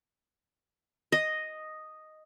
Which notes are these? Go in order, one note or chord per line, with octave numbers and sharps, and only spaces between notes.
D#5